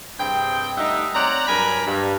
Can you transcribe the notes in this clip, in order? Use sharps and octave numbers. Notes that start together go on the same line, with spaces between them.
G2 C3 C4 G#4 G5
G3 A3 D#4 D#5 E5 F#5
C4 C#5 D5 F#5 A#5
G2 F#3 A#4 G#5 A#5 B5
G2